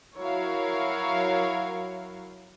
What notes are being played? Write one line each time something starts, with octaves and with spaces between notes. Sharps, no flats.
F#3 E4 F#4 A#4 C#5 F5